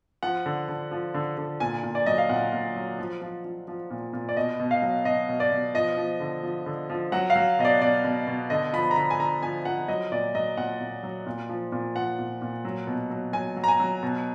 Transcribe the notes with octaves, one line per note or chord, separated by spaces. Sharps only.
F3 F#5
D3
D3
F3
D3
D3
A#2 G#5
A#2
D5
F#3 D#5
F5
A#2 F#5
A#2
F#3
F3
F3
F3
F3
A#2
A#2
D5
B2 D#5
B2
F5
F#3
B2 D#5
B2
D5
B2
F3 D#5
F3
D3
F3
D3
F3
F#3 F#5
F5
F#3
B2 D#5
D5
B2 D5
B2
B2
D3 D#5
F3 B5
A#5
D3 B5
G#5
D3 A#5
F3 G#5
F3 F#5
F#3 D#5
A#2 D5
F#3 D#5
A#2 F#5
A#2
F#3
A#2
F3
A#2
F3 F#5
A#2
A#2
F#3
B2
F#3
F#3 G#5
F#3
A#5
G#5
F#3
B2